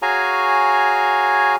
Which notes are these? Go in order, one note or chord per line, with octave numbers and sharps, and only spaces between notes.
F#4 G#4 C#5 F5 G#5 A#5